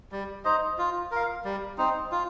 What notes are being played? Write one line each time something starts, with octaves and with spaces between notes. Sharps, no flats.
G3
D#4 C5 D#5
F4
A#4 F5
G3
C4 D#4
F4